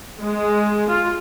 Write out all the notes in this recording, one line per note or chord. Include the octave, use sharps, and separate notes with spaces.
G#3
F4